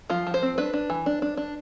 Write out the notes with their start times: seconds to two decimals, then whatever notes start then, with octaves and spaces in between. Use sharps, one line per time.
0.10 F3 F4
0.27 F3
0.34 C5
0.42 C4
0.58 D4 B4
0.73 D4
0.90 E3
1.06 D4
1.22 D4
1.37 D4